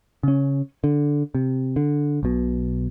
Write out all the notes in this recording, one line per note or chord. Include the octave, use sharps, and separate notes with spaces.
C#3 C#4
D3
C3
D3
B1 B2